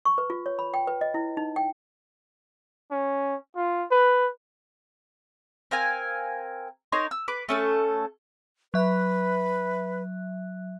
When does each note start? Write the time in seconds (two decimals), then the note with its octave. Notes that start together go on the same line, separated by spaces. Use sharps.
0.05 C#6
0.18 B4
0.30 F4
0.46 C#5
0.59 B5
0.74 G5
0.87 B4
1.01 D#5
1.14 E4
1.37 D#4
1.56 G5
2.91 C#4
3.56 F4
3.91 B4
5.71 C4 A#4 F5 G#5
6.92 D#4 A#4 C#5 C6
7.11 E6
7.28 B4 D6
7.49 A3 C#4 A4
8.74 F#3 B4 E5 F#6